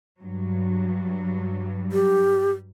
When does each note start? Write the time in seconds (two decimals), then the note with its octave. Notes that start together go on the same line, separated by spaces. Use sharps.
0.22 G2 F#3
1.92 G4